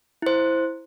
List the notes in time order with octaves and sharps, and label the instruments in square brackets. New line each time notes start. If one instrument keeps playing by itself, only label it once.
[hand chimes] E4 C5